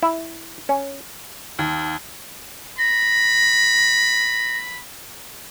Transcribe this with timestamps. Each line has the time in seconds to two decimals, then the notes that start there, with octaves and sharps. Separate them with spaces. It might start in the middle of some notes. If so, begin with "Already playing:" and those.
0.03 E4
0.69 C#4
1.59 D#2
2.79 B5 A#6